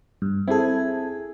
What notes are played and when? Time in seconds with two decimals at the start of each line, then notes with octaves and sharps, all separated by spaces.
0.22 G2
0.48 C4 E4 G#4 A4